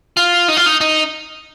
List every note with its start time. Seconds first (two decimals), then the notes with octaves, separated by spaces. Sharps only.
0.17 F4
0.48 D#4
0.57 F4
0.66 D#4
0.81 D#4